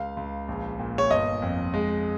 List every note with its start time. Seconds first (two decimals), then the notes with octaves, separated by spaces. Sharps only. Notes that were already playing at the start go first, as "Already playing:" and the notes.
Already playing: C#2 F5
0.17 C#2
0.48 A#1
0.80 A#2
0.98 C#5
1.10 G1 D#5
1.42 F2
1.74 G#3